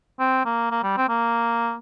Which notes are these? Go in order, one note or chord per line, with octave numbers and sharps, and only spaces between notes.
C4
A#3
A#3
G3
C4
A#3